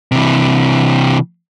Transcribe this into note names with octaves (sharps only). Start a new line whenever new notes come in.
C3 E3